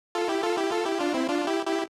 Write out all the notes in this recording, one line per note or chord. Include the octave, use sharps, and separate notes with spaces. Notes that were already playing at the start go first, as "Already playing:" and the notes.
F4 A4
E4 G4
F4 A4
E4 G4
F4 A4
E4 G4
D4 F4
C4 E4
D4 F4
E4 G4
E4 G4